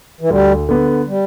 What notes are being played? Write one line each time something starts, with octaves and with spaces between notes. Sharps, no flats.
E3
D2 G3
D3 B3
G3